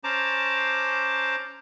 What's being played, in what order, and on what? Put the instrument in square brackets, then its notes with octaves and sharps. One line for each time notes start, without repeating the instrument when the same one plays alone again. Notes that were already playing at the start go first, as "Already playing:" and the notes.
[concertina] C#4 C5 A5 A#5 D6